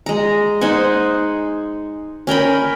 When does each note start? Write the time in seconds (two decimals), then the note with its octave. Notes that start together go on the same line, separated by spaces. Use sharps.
0.06 G#3 A#5
0.61 D#4 C5 F#5 G#5
2.27 C#4 A#4 G5 B5